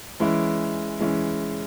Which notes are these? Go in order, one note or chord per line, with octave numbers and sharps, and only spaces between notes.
E3 G#3 C#4 E4
E3 G#3 C#4 E4